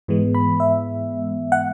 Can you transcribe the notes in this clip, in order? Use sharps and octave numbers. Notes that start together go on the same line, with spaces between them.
G#2 E3 G#3 B3
B5
E5
F#5